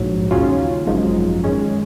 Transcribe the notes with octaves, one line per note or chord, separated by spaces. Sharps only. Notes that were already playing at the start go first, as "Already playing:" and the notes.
Already playing: A#1 G#2 F#3
D#2 C#3 F#3 C#4 F4
G#1 F#2 F3 G#3 D#4
D#3 G#3 C#4